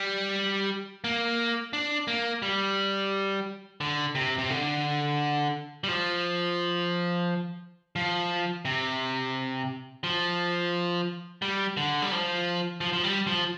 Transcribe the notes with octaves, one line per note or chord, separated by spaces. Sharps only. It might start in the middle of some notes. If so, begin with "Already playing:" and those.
Already playing: G3
A#3
D4
A#3
G3
D3
C3
C3
D3
G3
F3
F3
C3
F3
G3
D3
G3
F3
F3
F3
G3
F3